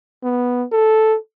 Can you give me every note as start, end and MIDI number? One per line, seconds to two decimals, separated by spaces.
0.23 0.64 59
0.72 1.16 69